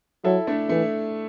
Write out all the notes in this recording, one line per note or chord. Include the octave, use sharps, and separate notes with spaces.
F#3 E4 A4
A3 D4
E3 A3